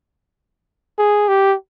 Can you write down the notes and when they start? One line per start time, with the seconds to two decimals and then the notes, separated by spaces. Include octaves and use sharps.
0.98 G#4
1.28 G4